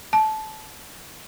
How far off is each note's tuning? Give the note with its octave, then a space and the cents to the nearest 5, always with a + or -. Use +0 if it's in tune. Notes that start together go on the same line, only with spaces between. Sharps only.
A5 -20